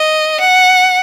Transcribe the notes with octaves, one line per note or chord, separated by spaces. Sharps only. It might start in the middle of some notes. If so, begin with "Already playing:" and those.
Already playing: D#5
F#5